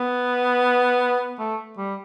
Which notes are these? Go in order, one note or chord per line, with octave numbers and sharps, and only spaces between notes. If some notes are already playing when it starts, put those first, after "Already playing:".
Already playing: B3
A3
G3